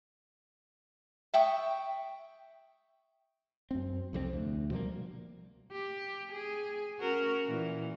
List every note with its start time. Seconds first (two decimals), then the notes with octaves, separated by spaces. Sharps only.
1.34 E5 G5 C#6 D#6
3.71 F#2 C4
4.13 C2 F2 F3 C4
4.33 D2
4.70 B2 F3 G3 A#3
5.71 G4
6.32 G#4
6.99 C#4 F#4 A#4
7.46 A#2 E3